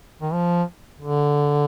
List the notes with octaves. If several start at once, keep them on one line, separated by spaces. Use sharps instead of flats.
D#3
F3
D3